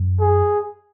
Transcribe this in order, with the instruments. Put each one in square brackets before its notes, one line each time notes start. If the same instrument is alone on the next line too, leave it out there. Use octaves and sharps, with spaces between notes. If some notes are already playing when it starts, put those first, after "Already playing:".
Already playing: [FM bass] F#2
[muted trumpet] G#4